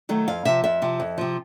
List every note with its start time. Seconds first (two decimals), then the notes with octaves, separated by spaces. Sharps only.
0.09 D#3 F#3 A3
0.28 F2 F5
0.45 C3 F3 E5
0.64 F2 E5
0.82 C3 F3
1.00 F2
1.18 C3 F3